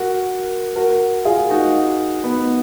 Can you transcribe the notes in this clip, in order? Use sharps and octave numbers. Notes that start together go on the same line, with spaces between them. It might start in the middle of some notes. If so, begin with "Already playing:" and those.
Already playing: F#4 A#4
F#4 A#4
F4 G#4
D#4 F#4
B3 D#4